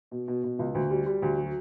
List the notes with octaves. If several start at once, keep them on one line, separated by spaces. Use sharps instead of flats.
B2
B2
B2
C#2
D2
G3
G3
D2
F#3